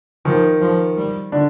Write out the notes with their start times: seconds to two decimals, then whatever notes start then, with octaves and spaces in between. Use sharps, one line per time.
0.25 D#3 F3 D#4
0.61 F3
0.97 G3
1.32 D3 D4